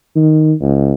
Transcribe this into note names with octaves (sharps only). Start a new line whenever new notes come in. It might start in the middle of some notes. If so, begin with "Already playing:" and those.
D#3
C#2